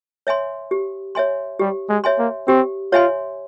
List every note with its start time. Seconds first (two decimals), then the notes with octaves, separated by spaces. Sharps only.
0.27 C#5 E5 G#5 C6
0.71 G4
1.15 C#5 E5 G#5 C6
1.59 G3 G4
1.89 G#3
2.04 C#5 E5 G#5 C6
2.19 A#3
2.48 C4 G4
2.92 F4 C#5 E5 G#5 C6